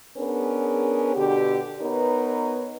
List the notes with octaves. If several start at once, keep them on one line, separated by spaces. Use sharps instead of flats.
B3 C#4 D4 G#4 A#4
B2 D3 D4 G4
B3 D#4 A#4 B4 C#5